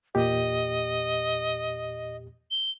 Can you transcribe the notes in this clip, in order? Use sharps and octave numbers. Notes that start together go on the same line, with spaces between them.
E2 A#2 G4 D#5
G7